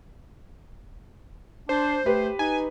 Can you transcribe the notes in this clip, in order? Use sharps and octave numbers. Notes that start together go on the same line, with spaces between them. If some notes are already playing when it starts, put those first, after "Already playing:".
D4 C5
A3 G4 B4
D#4 G#5